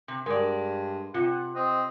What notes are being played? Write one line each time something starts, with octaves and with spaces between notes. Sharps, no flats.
C3
G2 G#3 A#4 D5
C3 F4 F#5
C4 D#5